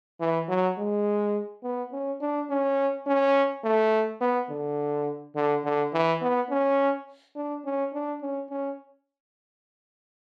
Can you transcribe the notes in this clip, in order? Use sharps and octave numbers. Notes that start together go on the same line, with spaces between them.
E3
F#3
G#3
B3
C#4
D4
C#4
C#4
A3
B3
D3
D3
D3
E3
B3
C#4
D4
C#4
D4
C#4
C#4